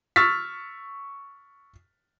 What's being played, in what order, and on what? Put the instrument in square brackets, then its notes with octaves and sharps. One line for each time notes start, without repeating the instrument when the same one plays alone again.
[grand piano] C#6 E6 F6 A6 B6